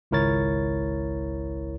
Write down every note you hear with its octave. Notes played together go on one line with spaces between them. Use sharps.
G#1 C#2 E4 A#4 C#5 A6